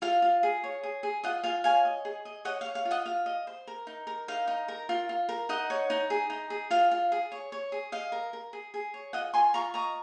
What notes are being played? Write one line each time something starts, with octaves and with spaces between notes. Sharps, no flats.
F4 F5
F4
G#4
C#5
G#4
G#4
F4 D#5 F#5
F4 F5 G#5
C#5 F5 G#5
D#5
G#4
D#5
C#5 D#5 F#5
F5
C#5
F5
F4
D#5 F#5
F4 F5
D#5
C5
A#4
D#4
A#4
D#4 F5
D#4
A#4
F4
F4
A#4
D#4 D#5 F#5
C#5
D#4
G#4
D#4
G#4
F4 F5
F4
G#4
C#5
C#5
G#4
D#5 F5
A#4
A#4
G#4
G#4
C#5
F4 D#5 F#5
F4 G#5 C6
F4 A#5 C#6
D#5 A#5 C#6